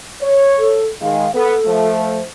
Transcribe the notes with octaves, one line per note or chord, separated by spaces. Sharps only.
C#5
A4
D#3 G#3 F5
B3 A4
F3 A3
C5